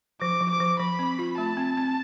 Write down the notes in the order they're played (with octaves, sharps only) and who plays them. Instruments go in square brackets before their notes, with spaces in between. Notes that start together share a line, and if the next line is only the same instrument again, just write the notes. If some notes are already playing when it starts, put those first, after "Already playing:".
[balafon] F3 [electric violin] D6
[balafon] F3
[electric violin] D6
[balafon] F3
[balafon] F3 [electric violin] B5
[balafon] C4
F4
[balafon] A3 [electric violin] A5
[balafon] C4
C4